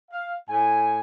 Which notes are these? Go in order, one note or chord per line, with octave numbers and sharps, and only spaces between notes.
F5
A2 G#5